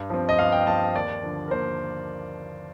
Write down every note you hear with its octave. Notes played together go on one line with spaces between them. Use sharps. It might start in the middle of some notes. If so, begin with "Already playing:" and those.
Already playing: G2
F3 C4
D#5
G2 F5
G5
F3 C4 A5
D#2 D5
D3 F3
A#4
D#2 C5